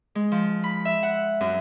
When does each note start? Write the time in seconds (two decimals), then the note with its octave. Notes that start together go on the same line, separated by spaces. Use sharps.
0.15 G#3
0.32 F3
0.64 B5
0.85 E5
1.03 F#5
1.41 F#2